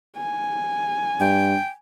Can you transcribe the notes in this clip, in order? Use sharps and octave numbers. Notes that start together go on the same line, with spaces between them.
G#5
G2 G5